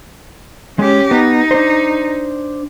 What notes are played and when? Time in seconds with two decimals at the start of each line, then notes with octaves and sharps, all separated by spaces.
0.79 G#3 C#4 G4
1.11 B3 D#4
1.51 D4 C5